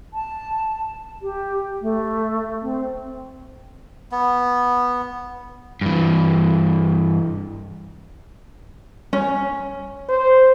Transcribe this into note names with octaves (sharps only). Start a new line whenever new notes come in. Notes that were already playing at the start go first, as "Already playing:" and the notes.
A5
G4
A3
C4
B3
G2 E3
C#4
C5